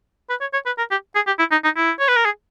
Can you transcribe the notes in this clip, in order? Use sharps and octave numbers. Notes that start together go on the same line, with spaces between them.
B4
C#5
C#5
B4
A#4
G4
G#4
G4
E4
D#4
D#4
E4
C#5
B4
A#4
G#4